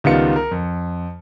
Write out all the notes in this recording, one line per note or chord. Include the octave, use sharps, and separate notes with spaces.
C#2 D#3 G3 B3 F4 C#7
A#4
F2